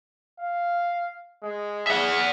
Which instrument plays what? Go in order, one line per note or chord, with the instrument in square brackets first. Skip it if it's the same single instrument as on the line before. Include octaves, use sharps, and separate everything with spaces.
[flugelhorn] F5
G#3
[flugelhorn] G#4 [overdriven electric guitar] E5 F#5